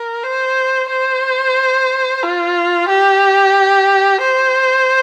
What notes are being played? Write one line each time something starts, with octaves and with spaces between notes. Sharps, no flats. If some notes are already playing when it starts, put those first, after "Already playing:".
Already playing: A#4
C5
C5
F4
G4
C5